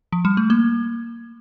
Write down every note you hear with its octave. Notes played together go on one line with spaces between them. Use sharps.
F3
G3
A3
A#3